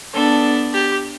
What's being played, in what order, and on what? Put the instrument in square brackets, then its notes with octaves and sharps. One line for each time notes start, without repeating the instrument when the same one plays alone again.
[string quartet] B3 D4 [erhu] A4
[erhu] G4